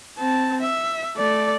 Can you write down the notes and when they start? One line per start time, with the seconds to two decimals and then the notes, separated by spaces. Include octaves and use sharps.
0.18 C4 A5
0.61 E5
1.16 A3 D5